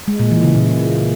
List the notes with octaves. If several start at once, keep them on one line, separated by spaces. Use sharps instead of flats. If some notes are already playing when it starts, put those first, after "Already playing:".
G#3
A#2
E3
C#3
A#2